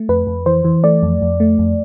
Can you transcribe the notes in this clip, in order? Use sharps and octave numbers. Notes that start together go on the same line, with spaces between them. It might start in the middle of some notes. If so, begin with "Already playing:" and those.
Already playing: A3
F2 B4
F2
E3 C5
E3
A3 D5
F2
F2
A3
F2